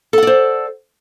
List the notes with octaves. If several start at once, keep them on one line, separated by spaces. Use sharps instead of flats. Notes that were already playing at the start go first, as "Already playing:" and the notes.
A4 C5 D5 F#5